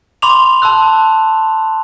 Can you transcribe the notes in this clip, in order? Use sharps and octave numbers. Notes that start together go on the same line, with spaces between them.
B5 C6 D6 F7
A5 C6 E6 F#6